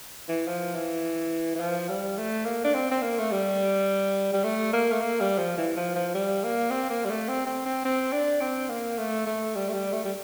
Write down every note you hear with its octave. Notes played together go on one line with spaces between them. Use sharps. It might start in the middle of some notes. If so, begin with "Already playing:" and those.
E3
F3
E3
E3
F3
G3
A3
A#3
D4
C4
C4
A#3
A3
G3
G3
A3
A#3
A3
A#3
G3
F3
E3
F3
F3
G3
A#3
C4
A#3
G3
A3
C4
C4
C4
C4
D4
C4
A#3
A3
A3
G3
A3
G3
A3
G3